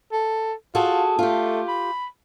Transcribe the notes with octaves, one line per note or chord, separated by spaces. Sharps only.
A4
F4 F#4 G#4 A4
A3 F4 G4
B5